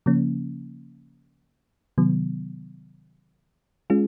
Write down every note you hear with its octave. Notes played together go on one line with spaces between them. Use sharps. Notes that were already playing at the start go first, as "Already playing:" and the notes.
C#3 F3 A#3 C#4
C3 D#3 F#3 B3
G#3 C#4 F4 G#4